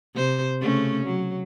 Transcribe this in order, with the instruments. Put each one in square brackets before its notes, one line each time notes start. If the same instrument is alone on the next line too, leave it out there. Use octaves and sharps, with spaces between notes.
[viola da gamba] C3 C5
C#3 A3 C#4
F#3